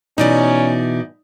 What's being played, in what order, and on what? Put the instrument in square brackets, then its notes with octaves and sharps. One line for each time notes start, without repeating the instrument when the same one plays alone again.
[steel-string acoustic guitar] B2 E3 E4 [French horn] C#4 [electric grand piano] D#4 D5